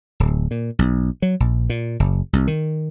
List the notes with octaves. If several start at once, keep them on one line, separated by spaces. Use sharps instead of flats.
D1
A#2
B1
F#3
A#1
A#2
F#1
C2
D#3